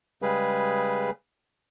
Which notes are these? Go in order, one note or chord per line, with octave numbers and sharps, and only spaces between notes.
C#3 G3 G#3 G#4 B4